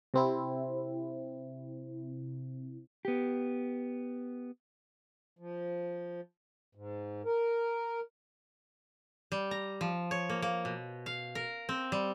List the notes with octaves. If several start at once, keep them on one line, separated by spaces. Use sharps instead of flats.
C3 C4 E4
B3 G4
F3
G#2
A#4
G3
A#5
F3
C#5
A#3
A#3
B2
F5
A#4
C4
G3